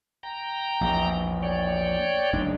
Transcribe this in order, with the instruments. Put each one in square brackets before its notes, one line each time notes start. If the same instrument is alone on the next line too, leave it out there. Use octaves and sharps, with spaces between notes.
[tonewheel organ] G5 A#5
[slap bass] A#1 E2
[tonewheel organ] C#5 D5 G5
[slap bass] F#1 G#3 D4